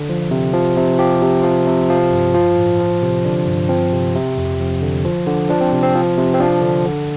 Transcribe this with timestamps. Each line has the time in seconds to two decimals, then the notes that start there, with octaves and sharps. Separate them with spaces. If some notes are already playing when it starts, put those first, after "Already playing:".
Already playing: D3
0.09 F3
0.31 C3
0.53 F3
0.77 C3
0.99 F3 G4
1.22 C3
1.44 F3
1.67 C3
1.90 F3
2.12 G2
2.34 F3 F4
2.56 A2
2.80 F3
3.02 C3
3.25 D3 D4
3.47 G2
3.69 F3 C4
3.93 C3
4.15 C3
4.37 F2
4.60 F3
4.82 D3
5.05 F3
5.27 D3
5.50 F3 D4
5.61 C4
5.72 C3
5.83 C4
5.95 F3
6.17 C3
6.34 C4
6.40 F3 D4
6.62 D3
6.85 D3